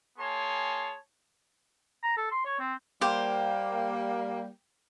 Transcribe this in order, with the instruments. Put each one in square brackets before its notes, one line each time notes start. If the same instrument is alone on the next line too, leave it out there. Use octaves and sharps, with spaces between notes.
[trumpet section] A#3 G#4 C#5 G#5 A5 C6
[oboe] A#5
A4
C6
C#5
C4
[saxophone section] G3 A#3 [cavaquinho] G4 C5